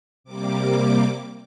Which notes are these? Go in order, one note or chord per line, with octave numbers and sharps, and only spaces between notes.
C3 G3 A#3 D6